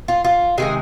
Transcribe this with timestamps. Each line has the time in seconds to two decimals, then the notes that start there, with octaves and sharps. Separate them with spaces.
0.08 F4
0.25 F4
0.58 C3 D#3 G#3 G#4